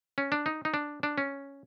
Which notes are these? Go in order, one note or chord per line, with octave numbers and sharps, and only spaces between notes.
C#4
D4
D#4
D#4
D4
D4
C#4